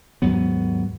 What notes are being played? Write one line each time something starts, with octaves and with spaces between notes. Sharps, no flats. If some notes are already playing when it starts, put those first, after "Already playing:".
D#2 G#2 F#3 B3